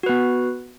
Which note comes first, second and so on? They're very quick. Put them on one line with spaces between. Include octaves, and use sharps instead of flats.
F#4 B4 B3